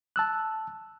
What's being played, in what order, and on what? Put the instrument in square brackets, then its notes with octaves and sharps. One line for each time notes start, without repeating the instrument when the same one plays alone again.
[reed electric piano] A5 E6 F#6